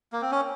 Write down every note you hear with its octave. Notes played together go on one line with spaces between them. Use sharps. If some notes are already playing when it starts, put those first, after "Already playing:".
A#3
C4
C#4